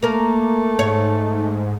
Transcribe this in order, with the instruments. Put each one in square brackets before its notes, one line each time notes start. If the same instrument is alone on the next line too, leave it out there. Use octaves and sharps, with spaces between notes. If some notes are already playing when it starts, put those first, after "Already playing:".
[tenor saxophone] A3 [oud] A#3 A#4
[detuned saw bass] G#2 [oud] C#5